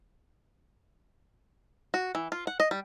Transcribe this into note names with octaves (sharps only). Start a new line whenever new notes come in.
F#4
E3
F4
F#5
D#5
G3